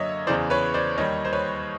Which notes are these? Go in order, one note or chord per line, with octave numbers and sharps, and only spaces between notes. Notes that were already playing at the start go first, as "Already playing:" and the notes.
Already playing: F#2 D3 F#3 A#3 C#5 D#5 E5
E2 C#3 E3 C5 D5
B4 C#5
C5 D5
D#2 D#3 G3 C#5 D#5
C5
B4 C#5